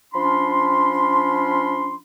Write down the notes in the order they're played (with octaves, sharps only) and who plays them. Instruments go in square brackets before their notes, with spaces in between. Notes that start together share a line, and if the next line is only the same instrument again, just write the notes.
[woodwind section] F3 C#4 D4 B5 C6